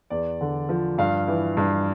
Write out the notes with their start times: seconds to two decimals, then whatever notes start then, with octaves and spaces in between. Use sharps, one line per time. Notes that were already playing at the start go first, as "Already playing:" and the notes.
0.10 E2 D5
0.41 D3
0.69 F3
0.98 G2 F5
1.28 E3
1.57 G2